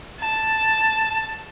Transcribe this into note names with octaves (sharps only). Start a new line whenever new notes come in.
A5